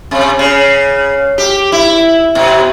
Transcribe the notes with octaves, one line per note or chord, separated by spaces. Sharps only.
C3
C#3
G4
E4
B2